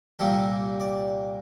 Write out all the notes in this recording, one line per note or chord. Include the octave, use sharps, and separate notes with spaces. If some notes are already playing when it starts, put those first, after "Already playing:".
C2 A#2 G3 A#3 A4
D5